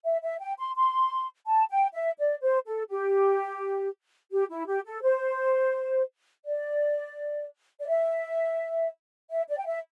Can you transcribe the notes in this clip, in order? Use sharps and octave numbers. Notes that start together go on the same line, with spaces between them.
E5
E5
G5
C6
C6
A5
G5
E5
D5
C5
A4
G4
G4
E4
G4
A4
C5
D5
D5
E5
E5
D5
G5
E5